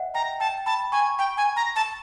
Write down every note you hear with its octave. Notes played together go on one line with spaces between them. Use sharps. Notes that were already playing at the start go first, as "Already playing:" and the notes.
Already playing: D#5 E5 F#5
G5 A#5
G5 A5
A5 B5
G#5 C#6
G5
G#5
A#5
A5